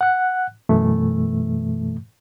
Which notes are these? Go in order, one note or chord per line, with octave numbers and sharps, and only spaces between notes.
F#5 F#6
F#2 B2 E3 A3